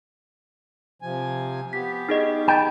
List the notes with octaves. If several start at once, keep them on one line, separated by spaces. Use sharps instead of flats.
C3 F3 G#5
B3 G4 B6
D#4 G#4 D#5
G5 B5 A6